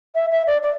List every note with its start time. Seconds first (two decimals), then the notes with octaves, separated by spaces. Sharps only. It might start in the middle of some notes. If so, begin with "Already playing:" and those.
0.15 E5
0.31 E5
0.47 D5
0.63 D5